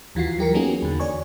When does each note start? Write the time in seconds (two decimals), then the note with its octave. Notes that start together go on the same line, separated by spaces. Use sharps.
0.15 D#2 E3 F4 F#4 C7
0.39 F#3 G4 A#4 C#7
0.54 A#3 B3 C#4 D#4 F#4 G#4
0.82 E2 D3
1.00 C#5 D5 G#5 C#6